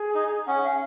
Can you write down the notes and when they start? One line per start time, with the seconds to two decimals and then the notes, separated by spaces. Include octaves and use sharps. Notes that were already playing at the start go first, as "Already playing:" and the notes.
Already playing: G#4
0.15 D#4
0.47 C#4 F#5
0.63 F5